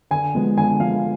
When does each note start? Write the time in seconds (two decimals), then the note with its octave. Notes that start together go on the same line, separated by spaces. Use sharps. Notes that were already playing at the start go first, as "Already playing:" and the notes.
0.11 D3 G#5
0.35 F3 G#3 B3
0.57 D3 G#5
0.80 F3 G#3 B3 F5